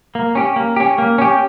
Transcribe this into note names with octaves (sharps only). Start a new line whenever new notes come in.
A#3
C#4 G4
A#3
C#4 G4
A#3
C#4 G4